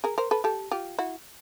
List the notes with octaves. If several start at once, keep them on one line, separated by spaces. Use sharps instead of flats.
G#4 A#4
A#4 C5
A4 B4
G4 A4
F4 G4
E4 F#4